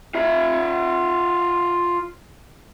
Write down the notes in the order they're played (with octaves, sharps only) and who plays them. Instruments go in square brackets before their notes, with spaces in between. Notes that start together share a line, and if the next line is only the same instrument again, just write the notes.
[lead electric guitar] F4 E5